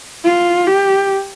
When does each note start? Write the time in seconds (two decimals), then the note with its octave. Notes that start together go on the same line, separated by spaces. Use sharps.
0.25 F4
0.67 G4